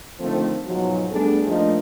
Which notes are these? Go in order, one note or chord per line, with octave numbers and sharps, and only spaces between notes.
D3 D#3 F3 A3 C4
G#2 B2 F3 F#3
G3 A3 B3 D4 G#4 A4
F3 A3 A#3 D4 D#4